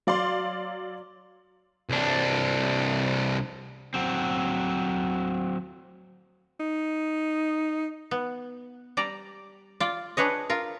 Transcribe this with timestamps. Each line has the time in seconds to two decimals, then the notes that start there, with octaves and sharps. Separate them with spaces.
0.07 F#3 D5 F5 C6
1.90 C2 D4
3.94 F#3 C4
6.60 D#4
8.11 B3
8.97 G3 D5 A#5
9.80 F4 D5
10.17 D4 G#4 B4 C#5 D#5
10.50 F4 A#4